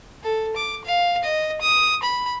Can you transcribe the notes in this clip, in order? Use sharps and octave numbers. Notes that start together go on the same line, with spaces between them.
A4
D6
F5
D#5
D#6
B5